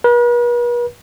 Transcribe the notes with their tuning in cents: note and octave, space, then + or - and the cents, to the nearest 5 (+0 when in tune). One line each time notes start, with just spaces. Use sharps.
B4 -45